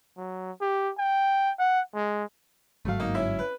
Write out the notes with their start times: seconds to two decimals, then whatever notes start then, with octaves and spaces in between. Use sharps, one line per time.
0.17 F#3
0.61 G4
0.98 G5
1.59 F#5
1.95 G#3
2.85 G1 G#2 F#3 A3 F5
3.00 A#3 D#4
3.15 C#4 E4 E5
3.39 B4